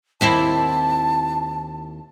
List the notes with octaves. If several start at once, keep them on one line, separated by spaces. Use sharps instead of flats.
D#2 C4 E4 A5